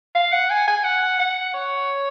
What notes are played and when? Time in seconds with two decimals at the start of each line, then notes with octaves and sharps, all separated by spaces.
0.15 F5
0.32 F#5
0.50 G#5
0.68 G#5
0.84 F#5
1.19 F#5
1.54 C#5